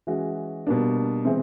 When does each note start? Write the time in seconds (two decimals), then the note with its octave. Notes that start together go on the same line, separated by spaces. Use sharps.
0.07 E3 G#3 C#4 F#4
0.67 B2 G3 A#3 D4
1.25 C3 E3 G#3 C4